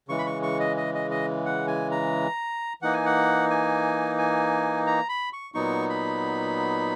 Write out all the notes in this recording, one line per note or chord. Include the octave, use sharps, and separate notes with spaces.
C#3 E3 G#3 C#6
B5
C#6
C#6
D#5
D#5
D#5
D#5
F#5
G#5
A#5
E3 A#3 D#4 F#5
G#5
F#5
G#5
G#5
A#5
B5
C#6
A#2 F#3 B3 D#4 C#6
B5